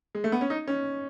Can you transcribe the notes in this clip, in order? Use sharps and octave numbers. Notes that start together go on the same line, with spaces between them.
G#3
A3
B3
C#4
D#4
C#4